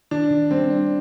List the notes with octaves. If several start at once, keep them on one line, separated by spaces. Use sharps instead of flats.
D#3 D4
D#3
G3 C4
D4